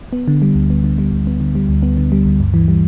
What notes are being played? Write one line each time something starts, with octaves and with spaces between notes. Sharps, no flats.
B3
D3
G3
D2
B3
D3
G3
D2
B3
D3
G3
D2
B3
D3
G3
D2
G2
E3
G3